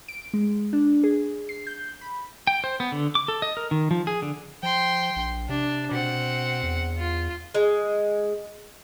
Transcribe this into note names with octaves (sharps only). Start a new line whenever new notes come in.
D7
G#3
D4
G#4
C7
G6
B5
G5
C5
B3
D3
D6
A4
D#5
A#4
D#3
F3
G#4
D3
F3 G5 C6
A#1
C3 D4
B2 C4 F#5
E2
F4
G#3